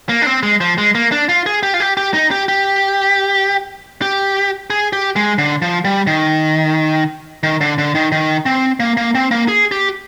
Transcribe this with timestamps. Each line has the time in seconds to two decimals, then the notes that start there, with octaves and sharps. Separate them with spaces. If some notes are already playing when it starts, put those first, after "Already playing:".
0.09 A#3
0.22 D4
0.26 C4
0.43 G#3
0.61 F3
0.78 G#3
0.95 A#3
1.12 D4
1.29 F4
1.46 G#4
1.63 G4
1.74 F4
1.80 G4
1.97 G4
2.14 D#4
2.31 G4
2.48 G4
4.02 G4
4.70 G#4
4.93 G4
5.16 G#3
5.38 D3
5.62 F3
5.85 G3
6.07 D#3
7.43 D#3
7.61 D3
7.78 D3
7.95 D#3
8.12 D#3
8.46 C4
8.80 A#3
8.97 A#3
9.15 C4
9.31 A#3
9.48 G#4
9.72 G4